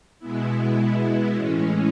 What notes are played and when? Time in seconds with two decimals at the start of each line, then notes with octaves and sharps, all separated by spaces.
0.19 B2 G#3 B3 E4
1.34 A2 E3 G#3 C#4